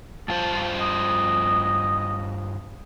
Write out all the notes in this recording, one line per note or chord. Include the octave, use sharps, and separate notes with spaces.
G2 F4 C5 A5
D#5